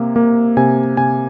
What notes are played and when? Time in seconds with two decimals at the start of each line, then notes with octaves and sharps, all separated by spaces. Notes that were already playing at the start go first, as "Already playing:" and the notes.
Already playing: C3 A#3
0.16 A#3
0.57 C3 G#5
0.97 C3 G#5